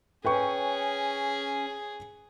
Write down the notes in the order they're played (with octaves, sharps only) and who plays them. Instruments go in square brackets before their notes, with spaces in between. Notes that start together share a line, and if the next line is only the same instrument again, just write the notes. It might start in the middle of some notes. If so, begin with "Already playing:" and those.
[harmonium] C#4 [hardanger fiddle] G#4 [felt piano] B4 G5 C#6